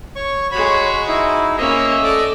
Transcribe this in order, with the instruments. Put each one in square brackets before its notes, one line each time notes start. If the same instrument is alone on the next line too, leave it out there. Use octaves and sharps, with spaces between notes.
[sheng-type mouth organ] C#5 C#6
[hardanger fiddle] G#3 F#4 [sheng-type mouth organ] C#5 B5
[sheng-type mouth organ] D#4 E4
[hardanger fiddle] A#3 C#4 [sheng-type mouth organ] D#5 E5
[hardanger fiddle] A3 D5